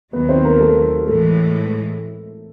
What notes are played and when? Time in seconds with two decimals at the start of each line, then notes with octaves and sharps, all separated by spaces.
0.13 D#2 D#3 F#3 B3 B4
0.29 C4 C5
0.45 A#3 A#4
0.60 A3 A4
1.07 A2 E3 G#3 A3 A4